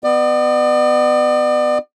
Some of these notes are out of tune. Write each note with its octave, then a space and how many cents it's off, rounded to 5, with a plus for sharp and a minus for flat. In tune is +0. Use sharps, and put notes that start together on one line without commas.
B3 +20 D5 +40